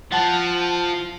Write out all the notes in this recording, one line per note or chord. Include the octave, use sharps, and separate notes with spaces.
F3 F#5 A5